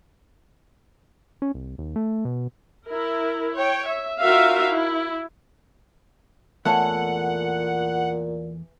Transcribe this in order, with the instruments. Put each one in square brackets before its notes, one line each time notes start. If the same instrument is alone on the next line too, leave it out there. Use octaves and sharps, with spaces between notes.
[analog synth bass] C#4
C2
D#2
A3
B2
[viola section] E4 A#4
C#5 G5
E5
D#4 F4 F#4 A#4 E5 F5
E4
[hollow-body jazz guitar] E2 A3 C#5 [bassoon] A#2 [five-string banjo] E3 A4 F5 [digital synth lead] F#5